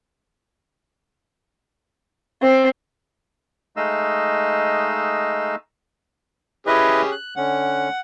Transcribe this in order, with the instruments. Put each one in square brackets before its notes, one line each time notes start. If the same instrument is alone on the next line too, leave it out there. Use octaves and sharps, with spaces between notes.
[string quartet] C4
[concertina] G#3 A3 D#4 D#5 F5 E6
[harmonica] C#4 G4 G#4 [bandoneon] E4 B4 D#5
[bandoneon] F#6
[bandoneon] D3 C#4 [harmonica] F#5